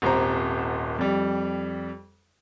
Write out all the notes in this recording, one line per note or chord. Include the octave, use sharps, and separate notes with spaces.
D#1 G#1 C5 A#5
F2 G3